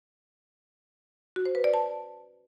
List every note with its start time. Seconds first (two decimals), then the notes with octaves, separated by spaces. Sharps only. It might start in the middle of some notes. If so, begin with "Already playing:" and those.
1.36 F#4
1.45 C5
1.55 B4
1.64 D5
1.74 A5